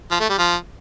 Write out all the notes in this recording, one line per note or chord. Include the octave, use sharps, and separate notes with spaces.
F3
A3
G3
F3